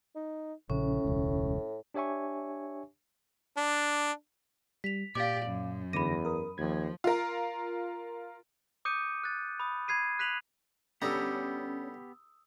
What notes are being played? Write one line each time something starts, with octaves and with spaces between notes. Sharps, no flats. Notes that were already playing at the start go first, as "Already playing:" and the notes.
D#4
A#1 A2 C#3 C#4
E1 C#2
D4 G4 C#5 E5 G#5 C#6
D4
G3 B6 F7
A#2 G4 D5 F5 D6
F#2
E2 D3 B5 D6 A#6 D#7
A#4 D#6
D#2 F3 G#6
F4 A#4
D6 D#6 G6 C#7 D#7
F#6 A6
B5 D#6
B5 G#6 C7 D#7
F#6 B6 D#7 F7 F#7
D3 G3 B3 C#4 G4 A#5 D#6 E6